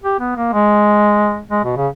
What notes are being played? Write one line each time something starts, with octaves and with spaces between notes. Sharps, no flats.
G4
B3
A#3
G#3
G#3
B2
C#3